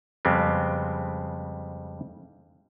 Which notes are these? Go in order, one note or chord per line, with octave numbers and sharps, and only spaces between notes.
F2 C#3 G3 G#3 B3 C4